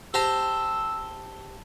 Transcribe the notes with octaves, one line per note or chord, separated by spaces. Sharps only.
G4 C5 A5 A#5 E6